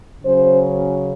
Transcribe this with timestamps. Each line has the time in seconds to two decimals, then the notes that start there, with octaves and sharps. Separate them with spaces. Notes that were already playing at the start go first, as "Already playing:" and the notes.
0.23 C#3 F#3 C#4 C5